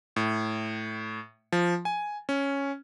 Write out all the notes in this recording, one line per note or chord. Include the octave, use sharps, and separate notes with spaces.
A2
F3
G#5
C#4